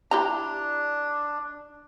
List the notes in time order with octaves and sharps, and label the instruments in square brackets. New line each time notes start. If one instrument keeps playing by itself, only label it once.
[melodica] D4 [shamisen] E4 G4 A#5